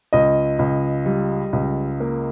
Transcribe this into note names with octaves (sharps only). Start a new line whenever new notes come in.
C#2 D#5
C#2
G3
C#2
A#3